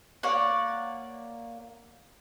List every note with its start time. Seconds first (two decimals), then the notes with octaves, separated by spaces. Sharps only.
0.23 A#3 C#5 D5 F#5